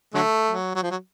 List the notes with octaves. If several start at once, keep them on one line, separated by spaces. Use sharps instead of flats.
D3 F#3 A3
F#3
F#3
F3
F#3